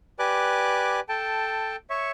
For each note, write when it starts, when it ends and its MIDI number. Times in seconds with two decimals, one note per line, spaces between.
0.19 1.00 67
0.19 1.00 71
0.19 1.00 74
0.19 1.00 80
0.19 1.00 86
0.19 1.00 90
1.09 1.76 69
1.09 1.76 79
1.09 1.76 81
1.90 2.12 73
1.90 2.12 76
1.90 2.12 85